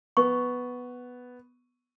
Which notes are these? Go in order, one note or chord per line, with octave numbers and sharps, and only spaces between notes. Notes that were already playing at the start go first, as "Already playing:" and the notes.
B3 C#6